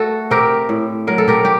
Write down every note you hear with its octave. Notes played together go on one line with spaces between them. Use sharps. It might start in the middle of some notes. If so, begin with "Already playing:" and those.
Already playing: A3 F#4 A4
C4 G4 A#4
A2
F#3 A#4
A4
G4 A#4
G4